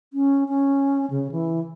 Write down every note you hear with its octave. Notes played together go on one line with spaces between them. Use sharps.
C#4
C#4
C#3
E3